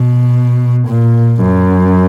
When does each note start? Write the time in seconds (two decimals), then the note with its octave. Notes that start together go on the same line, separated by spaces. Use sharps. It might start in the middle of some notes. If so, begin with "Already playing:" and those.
Already playing: B2
0.88 A#2
1.43 F#2